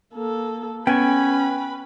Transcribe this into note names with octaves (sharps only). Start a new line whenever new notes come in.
A#3 A4
B3 C#4 B4 G5 G#5 B5 C#6